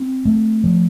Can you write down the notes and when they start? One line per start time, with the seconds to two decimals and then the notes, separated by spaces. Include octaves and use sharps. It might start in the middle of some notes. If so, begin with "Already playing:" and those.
Already playing: C4
0.25 A3
0.64 F3